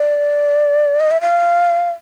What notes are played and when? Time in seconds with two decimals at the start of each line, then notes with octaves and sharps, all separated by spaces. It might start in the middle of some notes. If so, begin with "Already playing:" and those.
Already playing: D5
1.00 D#5
1.11 E5
1.21 F5